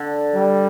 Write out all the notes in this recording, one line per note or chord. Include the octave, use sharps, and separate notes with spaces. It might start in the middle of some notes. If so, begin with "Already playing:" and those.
Already playing: D3
G3